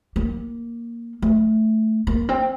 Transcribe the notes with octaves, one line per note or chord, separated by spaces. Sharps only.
A#3
A3
A#3
C4